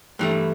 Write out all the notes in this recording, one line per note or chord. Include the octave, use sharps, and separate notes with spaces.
G2 E3 A3